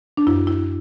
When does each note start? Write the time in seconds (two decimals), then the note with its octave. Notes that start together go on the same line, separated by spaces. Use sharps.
0.17 D4
0.27 F#2 E4
0.47 E4